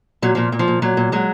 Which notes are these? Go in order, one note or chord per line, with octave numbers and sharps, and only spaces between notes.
A#2 F#3
A#2 F3
A#2
F3
A#2
A#2 F#3
A#2
A#2 F#3 G#3